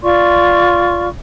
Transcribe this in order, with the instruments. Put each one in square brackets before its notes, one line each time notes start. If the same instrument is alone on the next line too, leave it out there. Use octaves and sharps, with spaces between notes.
[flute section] F4 D5 C6 C#6